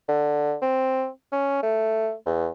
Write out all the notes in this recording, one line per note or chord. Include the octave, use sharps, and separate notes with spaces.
D3
C4
C#4
A3
E2